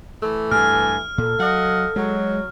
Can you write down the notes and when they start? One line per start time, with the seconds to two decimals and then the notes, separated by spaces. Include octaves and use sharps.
0.22 E3 A3
0.51 G2 G#5 F6
1.18 A#2 A4
1.39 F#3 D#5 F5 F#5
1.96 F#3 G#3